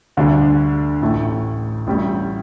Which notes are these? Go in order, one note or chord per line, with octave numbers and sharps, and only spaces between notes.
D2 D3 G3 D4
A1 A2 A3
A1 A2 G3